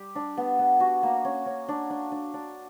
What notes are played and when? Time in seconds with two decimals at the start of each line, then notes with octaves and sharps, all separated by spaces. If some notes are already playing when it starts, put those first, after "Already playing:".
Already playing: G3 G4
0.16 D4
0.37 B3
0.59 B3
0.80 F#4
1.03 A#3
1.25 C#4
1.46 C#4
1.69 D4
1.90 D4
2.12 D4
2.34 D4